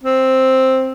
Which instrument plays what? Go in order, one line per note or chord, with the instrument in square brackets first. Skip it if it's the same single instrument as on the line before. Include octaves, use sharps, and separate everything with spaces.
[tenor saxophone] C4